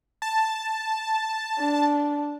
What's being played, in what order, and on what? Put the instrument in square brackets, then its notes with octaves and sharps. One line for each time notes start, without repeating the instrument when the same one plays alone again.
[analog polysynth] A5
[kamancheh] D4